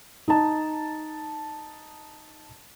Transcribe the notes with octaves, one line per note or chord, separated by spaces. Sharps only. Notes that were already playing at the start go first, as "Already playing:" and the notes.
D#4 A5